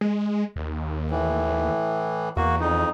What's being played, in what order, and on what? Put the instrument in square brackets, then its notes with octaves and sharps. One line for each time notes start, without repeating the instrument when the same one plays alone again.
[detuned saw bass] G#3
D#2
[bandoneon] A2 E3
[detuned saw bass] E2 [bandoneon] A#3 F#4
[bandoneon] F2 D#4